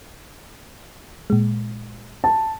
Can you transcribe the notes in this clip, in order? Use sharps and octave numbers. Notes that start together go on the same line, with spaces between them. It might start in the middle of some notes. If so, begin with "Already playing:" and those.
A#2 G#3
A5